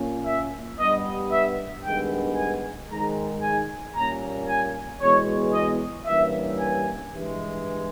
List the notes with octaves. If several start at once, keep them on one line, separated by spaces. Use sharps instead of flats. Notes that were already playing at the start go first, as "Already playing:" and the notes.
Already playing: A#2 A#3 C#4
E5
G2 G3 B3 D#5
E5
G2 D#3 G#3 B3 G5
G#5
G#2 D#3 G#3 A#5
G#5
A#2 G3 A#3 C#4 A#5
G#5
E2 B2 G#3 C#5
D#5
G2 E3 G3 A#3 C#4 E5
G#5
G2 E3 G#3